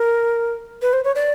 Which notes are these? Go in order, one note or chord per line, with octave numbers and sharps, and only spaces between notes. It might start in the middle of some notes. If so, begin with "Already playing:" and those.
Already playing: A#4
B4
C5
C#5
D5